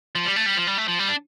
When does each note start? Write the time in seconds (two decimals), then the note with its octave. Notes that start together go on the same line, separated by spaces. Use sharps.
0.15 F3
0.25 G3
0.36 A3
0.46 G3
0.57 F3
0.67 G3
0.78 A3
0.88 F3
0.99 G3
1.09 D4